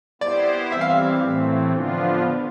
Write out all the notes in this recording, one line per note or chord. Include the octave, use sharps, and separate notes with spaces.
B3 E4 G4 C5 D5
E3 G3 C4 E5
F5
E5
A2 E3 A3 C4
D3 F3 B3 D4 F4